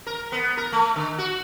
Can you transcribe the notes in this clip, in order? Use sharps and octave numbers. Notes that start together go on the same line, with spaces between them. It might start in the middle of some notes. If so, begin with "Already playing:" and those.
A#4
B3
A#4
A3
D3
F#4